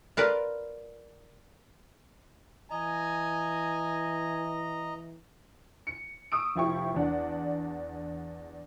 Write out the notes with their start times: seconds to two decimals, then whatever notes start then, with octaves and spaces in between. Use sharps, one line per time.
0.17 F4 A#4 B4 D5
2.70 E3 D#5 G#5 A#5
5.87 C#7
6.32 C#6 D#6 E6 D7
6.56 F1 F3 E4 G4 C#6
6.95 E2 D4 F#5